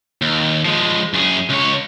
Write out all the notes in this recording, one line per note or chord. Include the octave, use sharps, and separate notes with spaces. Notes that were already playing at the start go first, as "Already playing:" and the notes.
D#2
F3 G#3
F#2 G#4
C#2 C#5